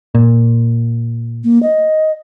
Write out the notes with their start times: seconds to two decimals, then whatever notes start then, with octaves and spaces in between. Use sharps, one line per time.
0.15 A#2
1.44 A#3
1.63 D#5